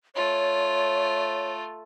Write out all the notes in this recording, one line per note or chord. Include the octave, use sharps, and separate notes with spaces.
A3 F4 C#5